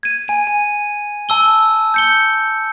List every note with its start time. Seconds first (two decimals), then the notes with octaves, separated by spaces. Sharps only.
0.03 G#6 D#7
0.28 G#5 D#7
0.47 G#5
1.29 A5 E6 G7
1.94 G6 C#7 G7